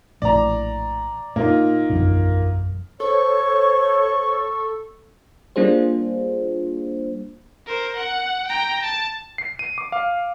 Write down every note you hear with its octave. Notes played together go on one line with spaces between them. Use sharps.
A#1 A2 D5 A#5
A#2 A#3 D#4 F4
E1 A#1 F#2
A4 C5 C#5 C#6
G3 A#3 D4 F4 G#4 C5
A#4 C5
F#5
G5 A#5
A5
C7
D#7
D6
F5